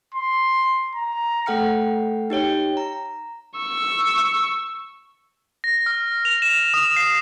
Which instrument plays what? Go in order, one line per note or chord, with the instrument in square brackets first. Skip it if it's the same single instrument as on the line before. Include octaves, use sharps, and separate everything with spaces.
[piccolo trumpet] C6
A#5
[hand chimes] A3 A4 F#5 G5 F6 C#7
D#4 G4 C#5 G5
A#5
[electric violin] C#6 E6
[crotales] A#6
F6
F7
E7
D#6
C7